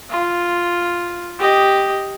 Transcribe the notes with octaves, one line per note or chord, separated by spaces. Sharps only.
F4
G4 D#5